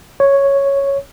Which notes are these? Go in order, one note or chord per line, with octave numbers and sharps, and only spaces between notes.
C#5